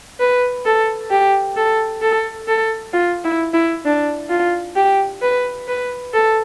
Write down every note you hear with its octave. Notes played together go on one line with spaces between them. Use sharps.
B4
A4
G4
A4
A4
A4
F4
E4
E4
D4
F4
G4
B4
B4
A4